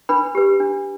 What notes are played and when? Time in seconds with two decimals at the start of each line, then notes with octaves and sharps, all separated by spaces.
0.09 D4 B4 B5
0.35 G4 B4
0.60 D4